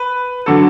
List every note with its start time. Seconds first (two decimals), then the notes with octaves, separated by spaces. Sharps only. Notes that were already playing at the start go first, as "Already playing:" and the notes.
Already playing: B4
0.46 D3 F#3 A4